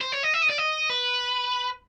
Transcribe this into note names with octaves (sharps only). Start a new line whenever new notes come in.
C5
C#5
D#5
E5
D#5
D5
D#5
B4